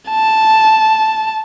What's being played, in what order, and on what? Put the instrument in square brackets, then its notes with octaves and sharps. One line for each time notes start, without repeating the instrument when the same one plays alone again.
[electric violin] A5